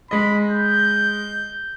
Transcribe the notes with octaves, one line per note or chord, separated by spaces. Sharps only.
G#3 D#5 B5
G6